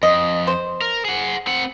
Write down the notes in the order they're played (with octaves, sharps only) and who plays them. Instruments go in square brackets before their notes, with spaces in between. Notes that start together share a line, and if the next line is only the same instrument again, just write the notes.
[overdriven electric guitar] F2 [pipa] D#5
[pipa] C5
[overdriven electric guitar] A#4
G#4 F#5
C4 F#5